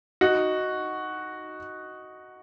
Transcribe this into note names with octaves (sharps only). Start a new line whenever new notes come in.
D#4 F#4